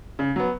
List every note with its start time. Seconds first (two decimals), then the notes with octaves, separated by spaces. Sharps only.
0.19 C#3
0.36 F#3 B3